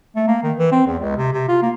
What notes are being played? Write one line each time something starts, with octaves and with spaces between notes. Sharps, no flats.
A3
A#3
D#3
E3
C4
E2
C#2
C3
C3
F4
A#3